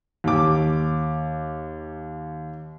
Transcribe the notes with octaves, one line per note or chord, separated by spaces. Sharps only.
D#2 D6